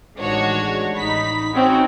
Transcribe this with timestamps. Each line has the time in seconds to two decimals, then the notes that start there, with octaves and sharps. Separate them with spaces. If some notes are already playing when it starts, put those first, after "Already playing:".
0.18 A1 D#3 G#3 D4 F#4 C#5
0.97 A1 D#4 B5 B6
1.54 C4 C#4 D#4 F#4